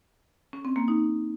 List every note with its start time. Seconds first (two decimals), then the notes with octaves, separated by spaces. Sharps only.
0.53 C#4
0.65 C4
0.76 A#3
0.88 D#4